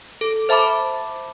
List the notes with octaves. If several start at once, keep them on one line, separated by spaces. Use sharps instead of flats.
A4
C5 E5 A5 B5 D6